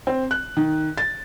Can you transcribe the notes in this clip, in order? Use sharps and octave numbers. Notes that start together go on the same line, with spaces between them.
C4
F#6
D#3
A6